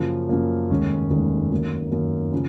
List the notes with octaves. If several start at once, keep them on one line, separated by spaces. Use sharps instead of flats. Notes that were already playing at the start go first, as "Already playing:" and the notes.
Already playing: F#2 C#3 F3 A#3
F#2 C#3 F3 A#3
F1 D#2 D#3 G#3 C#4
F1 D#2 D#3 G#3 C#4
F#2 D#3 A#3
F#2 D#3 A#3
C#3 F3